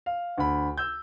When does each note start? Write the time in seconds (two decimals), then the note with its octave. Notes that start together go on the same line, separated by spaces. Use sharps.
0.06 F5
0.37 D2 B5
0.78 E6 G6